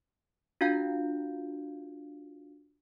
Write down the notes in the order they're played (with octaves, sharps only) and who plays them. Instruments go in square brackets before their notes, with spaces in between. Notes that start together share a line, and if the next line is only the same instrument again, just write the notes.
[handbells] D4 F4 F#4 F5 G6